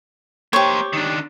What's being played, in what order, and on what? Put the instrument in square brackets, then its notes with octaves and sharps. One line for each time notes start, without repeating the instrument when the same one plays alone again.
[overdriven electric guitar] A#3 C5 [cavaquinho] G4 C#5
[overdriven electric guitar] D#3 D4